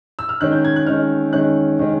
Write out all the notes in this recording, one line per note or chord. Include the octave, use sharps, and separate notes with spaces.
E6
F6
D#3 G#3 C#4 F#6
G6
G#6
F#6
D#3 G#3 C#4 F6
D#3 G#3 C#4 F#6
D#3 G#3 C#4